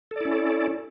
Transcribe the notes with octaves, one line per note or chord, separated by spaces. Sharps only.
C#4 E4 A4 D5